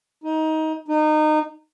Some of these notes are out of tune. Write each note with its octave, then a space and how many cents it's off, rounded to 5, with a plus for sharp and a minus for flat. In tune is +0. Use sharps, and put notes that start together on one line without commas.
D#4 +20
D#4 -25